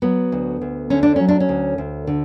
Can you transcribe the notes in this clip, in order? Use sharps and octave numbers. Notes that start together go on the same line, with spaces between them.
F#3 B3
D2
D2
D3 C#4
D4
F#3 C#4
D4
C#4
D2
D2
D3